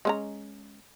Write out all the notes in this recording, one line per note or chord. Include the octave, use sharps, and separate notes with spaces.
G#3 C#4 A#5